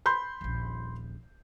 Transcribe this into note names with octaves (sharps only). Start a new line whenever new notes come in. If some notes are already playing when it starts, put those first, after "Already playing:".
B5 C6 G6
D#1 A#1